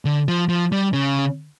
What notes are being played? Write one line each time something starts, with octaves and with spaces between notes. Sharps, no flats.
D3
F3
F3
G3
C#3